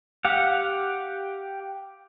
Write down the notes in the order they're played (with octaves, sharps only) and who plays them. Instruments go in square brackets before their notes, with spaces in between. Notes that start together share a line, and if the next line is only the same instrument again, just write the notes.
[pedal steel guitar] G4 F5 F#5